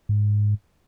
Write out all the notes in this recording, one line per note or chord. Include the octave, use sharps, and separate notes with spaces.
G#2